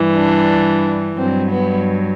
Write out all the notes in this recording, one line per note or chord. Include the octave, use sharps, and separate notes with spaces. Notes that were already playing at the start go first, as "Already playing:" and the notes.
Already playing: G2 E3 G3
D4
G2 F#3 C4
B3